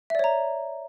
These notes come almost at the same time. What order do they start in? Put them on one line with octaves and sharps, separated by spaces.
E5 D5 C#5 A#5